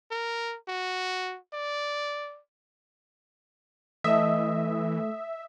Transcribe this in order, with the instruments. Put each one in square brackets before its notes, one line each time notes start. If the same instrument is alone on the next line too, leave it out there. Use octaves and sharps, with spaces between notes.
[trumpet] A#4
F#4
D5
[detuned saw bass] E3 [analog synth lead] A3 [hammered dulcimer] D#5 [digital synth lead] E5